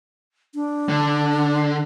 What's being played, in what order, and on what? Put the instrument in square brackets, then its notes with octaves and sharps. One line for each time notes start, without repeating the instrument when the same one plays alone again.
[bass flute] D4
[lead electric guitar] D3